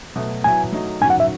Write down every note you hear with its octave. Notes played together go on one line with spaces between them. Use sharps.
B2 F#3 A3
F#3 B3 E4 G#5
F#3 A3 D#4 F#4
D#3 F#3 C#4 F#4 G#5
F#5
E5